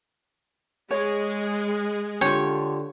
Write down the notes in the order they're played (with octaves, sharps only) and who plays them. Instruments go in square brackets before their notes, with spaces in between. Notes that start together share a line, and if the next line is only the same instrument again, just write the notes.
[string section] G#3 [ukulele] C#5
[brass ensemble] D3 [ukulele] F4 G4 [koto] C#5